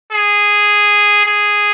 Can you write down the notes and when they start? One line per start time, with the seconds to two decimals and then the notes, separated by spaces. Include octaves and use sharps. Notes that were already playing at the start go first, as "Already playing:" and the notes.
0.12 G#4
1.25 G#4